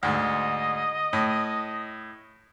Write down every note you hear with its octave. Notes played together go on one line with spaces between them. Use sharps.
D2 G#2 D#5
A2